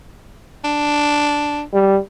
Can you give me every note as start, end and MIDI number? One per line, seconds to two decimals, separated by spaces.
0.64 1.63 62
1.73 1.98 55